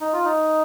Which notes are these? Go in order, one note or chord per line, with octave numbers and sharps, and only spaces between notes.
D#4
F4
D#4